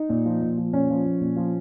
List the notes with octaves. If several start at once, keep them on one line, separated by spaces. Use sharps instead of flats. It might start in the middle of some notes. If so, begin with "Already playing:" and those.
Already playing: D#4
A#2
F3
A#2
F3
A#2 C#4
F3
F3
A#2
F3